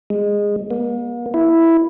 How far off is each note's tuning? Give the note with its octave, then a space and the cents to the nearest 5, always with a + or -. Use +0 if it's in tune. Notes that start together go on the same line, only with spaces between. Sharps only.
G#3 -15
A#3 +45
E4 +0